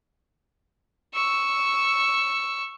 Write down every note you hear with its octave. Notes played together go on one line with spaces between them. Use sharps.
C#6 E6